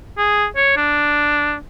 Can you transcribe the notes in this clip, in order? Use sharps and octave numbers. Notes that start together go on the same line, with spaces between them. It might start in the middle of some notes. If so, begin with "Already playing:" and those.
G#4
C#5
D4